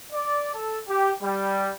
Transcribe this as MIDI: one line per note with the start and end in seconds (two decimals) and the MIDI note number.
0.12 0.51 74
0.53 0.78 69
0.87 1.11 67
1.22 1.71 55